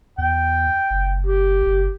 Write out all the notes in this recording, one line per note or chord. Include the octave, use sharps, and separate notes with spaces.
E2 G5
F#1
G4
F#1